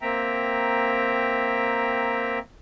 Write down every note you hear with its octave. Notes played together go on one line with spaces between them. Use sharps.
A#3 C4 E5 G5 A#5